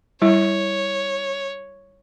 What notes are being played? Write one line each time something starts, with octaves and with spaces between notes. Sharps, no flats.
G3 E4 C#5